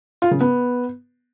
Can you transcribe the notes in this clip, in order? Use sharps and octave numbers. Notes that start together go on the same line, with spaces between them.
F4
C#3
B3